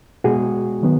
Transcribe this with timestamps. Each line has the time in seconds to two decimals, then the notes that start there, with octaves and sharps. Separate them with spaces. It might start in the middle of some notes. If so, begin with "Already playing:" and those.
0.24 B2 G#3 B3 F#4 G#4
0.83 D#3 F#3 B3